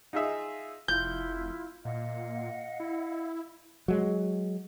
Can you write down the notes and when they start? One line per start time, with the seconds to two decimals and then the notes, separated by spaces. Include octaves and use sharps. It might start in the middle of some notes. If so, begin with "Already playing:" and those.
0.13 D#4 F4 G#4 D#5 E5
0.88 F1 E4 F4 G6
1.85 A#2 D#5 F5 F#5
2.80 E4
3.88 F#3 G#3